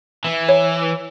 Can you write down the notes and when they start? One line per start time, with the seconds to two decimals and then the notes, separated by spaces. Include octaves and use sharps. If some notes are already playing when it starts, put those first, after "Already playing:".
0.25 E3
0.49 C#5